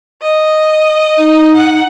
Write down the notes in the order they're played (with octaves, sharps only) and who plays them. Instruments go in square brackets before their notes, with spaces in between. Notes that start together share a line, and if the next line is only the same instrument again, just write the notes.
[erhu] D#5
[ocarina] D#4
[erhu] F#5